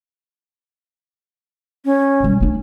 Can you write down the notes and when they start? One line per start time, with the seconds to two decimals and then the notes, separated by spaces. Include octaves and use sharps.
1.85 C#4
2.20 B2 G3
2.41 A3 D4